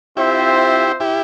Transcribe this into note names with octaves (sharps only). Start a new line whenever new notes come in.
C4 E4 F4 G4 C5 E5
E4 G4